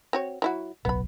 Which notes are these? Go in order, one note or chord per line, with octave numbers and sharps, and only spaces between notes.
C4 F#4 C#5
F#3 E4 F#4
D1 B1 F#3 B3 B5